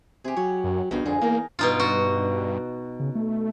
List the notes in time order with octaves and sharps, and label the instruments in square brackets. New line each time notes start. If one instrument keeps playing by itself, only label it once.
[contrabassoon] C3 [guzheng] G4 G#4
[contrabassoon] F#3 [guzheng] C#5
[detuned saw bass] F#2
[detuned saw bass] A#1 [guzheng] G2 D#4 F5 [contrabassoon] B2
[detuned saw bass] F2 [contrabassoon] D3 [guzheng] G#4
[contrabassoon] E2 [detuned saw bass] A#3 [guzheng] D#4 A#4
[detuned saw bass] G2 [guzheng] B2 D#4 F4
[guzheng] F#4
[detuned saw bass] C#3
A3